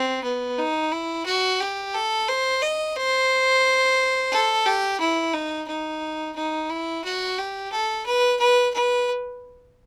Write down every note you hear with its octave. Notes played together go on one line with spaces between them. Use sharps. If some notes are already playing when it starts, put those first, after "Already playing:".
Already playing: C4
B3
D#4
E4
F#4
G4
A4
C5
D#5
C5
A4
G4
E4
D#4
D#4
D#4
E4
F#4
G4
A4
B4
B4
B4